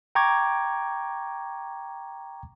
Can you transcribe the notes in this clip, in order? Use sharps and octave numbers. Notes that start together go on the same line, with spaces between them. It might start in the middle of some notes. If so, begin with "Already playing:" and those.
G5 A#5 C#6 D6 G#6